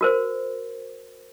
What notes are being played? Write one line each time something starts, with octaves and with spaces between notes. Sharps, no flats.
F#4 A#4 C5